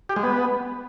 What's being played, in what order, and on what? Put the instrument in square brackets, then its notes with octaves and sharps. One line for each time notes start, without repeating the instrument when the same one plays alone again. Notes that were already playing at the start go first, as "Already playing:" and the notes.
[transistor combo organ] G4
G#3
B3